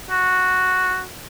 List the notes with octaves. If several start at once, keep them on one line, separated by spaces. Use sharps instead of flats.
F#4